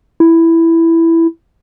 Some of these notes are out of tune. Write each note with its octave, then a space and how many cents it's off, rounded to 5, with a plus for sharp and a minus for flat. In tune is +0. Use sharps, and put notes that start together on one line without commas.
E4 +5